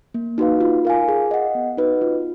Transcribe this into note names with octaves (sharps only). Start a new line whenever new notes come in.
A#3
D#4 F#4 B4 F5
F4
A#4 F5 G#5
G#4
D#5 F#5
B3
D#4 F#4 B4 D#5
F4